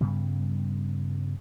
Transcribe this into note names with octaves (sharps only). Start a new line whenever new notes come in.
G2 C#3 G3 B3